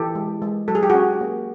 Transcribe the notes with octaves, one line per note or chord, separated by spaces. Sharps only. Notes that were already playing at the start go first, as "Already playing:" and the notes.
Already playing: E3 G4 A4
G#3
G#3
F#3 A4
G#4
G4
C#4 F#4 G#4
A#3